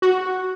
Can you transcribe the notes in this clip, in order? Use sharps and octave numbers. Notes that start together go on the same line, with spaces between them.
F#4